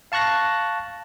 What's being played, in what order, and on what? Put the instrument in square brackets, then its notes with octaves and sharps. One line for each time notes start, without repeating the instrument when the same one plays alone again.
[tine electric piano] F5 A5 C#6 F#6 A#6